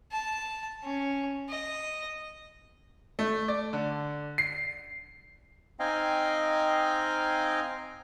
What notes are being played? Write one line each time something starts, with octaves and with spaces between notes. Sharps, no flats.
A5
C#4
D#5
A3
D5
D3
C7
C4 D#4 D#5 F5 G5 G#5